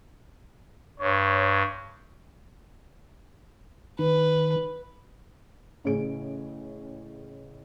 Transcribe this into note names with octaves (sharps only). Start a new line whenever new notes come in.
G2 C#5
D#3 B4
A1 A2 C#3 C#4 G#4 D7